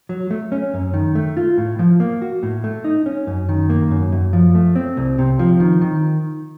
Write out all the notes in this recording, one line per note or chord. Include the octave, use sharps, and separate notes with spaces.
F#3
A3
C#4
F#2
D#3
A3
F4
A2
F3
A#3
F#4
A2
A3
D#4
C#4
F#2
D#3
A#3
F#2
F#2
F3
A3
C4
C2
C3
F3
D#3
D#3